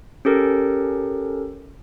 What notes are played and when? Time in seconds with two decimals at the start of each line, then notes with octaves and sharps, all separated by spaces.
0.25 C#4 G4 A4 A#4